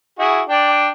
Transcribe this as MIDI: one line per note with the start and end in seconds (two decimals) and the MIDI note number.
0.19 0.41 64
0.19 0.41 66
0.19 0.41 68
0.49 0.89 62
0.49 0.89 74
0.49 0.89 79